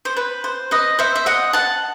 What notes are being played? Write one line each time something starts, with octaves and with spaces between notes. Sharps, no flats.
C5
B4
C5
B4 D#5
C5 E5
E5
D#5 F#5
F#5 A5